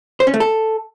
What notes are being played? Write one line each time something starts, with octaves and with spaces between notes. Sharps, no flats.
C5
C#4
A3
A4